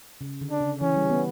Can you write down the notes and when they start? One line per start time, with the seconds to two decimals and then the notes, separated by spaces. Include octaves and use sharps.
0.21 C#3
0.41 D3
0.51 D4
0.61 C#3
0.80 E3 C#4
0.96 G3
1.10 B3